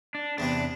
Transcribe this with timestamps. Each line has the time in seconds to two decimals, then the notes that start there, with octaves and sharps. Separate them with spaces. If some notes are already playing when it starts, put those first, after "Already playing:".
0.15 D4
0.38 E2 C3 E3 D4